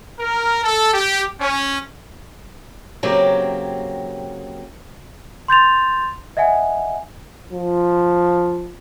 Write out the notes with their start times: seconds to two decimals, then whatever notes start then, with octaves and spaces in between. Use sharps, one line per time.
0.20 A#4
0.64 A4
0.94 G4
1.41 C#4
3.03 C#3 F#3 A#3 C4 G4
5.48 C6 G6 A6 F7
6.37 D#5 E5 F#5 G#5
7.53 F3